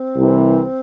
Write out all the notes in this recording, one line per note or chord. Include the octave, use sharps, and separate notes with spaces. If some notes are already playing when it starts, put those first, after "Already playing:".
Already playing: C4
C2 C3 E3